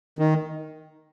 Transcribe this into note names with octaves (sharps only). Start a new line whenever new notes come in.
D#3